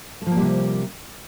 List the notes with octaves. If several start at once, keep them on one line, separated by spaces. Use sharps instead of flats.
C3 F3 G3 A3 A#3